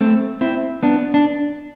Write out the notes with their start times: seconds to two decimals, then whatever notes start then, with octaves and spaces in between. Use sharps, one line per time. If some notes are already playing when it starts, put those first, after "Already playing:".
0.01 A3 C4
0.41 C4 E4
0.83 B3 D4
1.14 D4